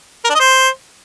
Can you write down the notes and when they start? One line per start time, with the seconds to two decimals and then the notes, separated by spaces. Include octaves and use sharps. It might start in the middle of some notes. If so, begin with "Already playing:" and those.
0.25 A#4
0.30 D4
0.35 D#5
0.40 C5